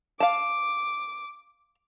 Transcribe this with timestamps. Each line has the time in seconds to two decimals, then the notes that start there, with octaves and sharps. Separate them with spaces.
0.20 F5 A5 D6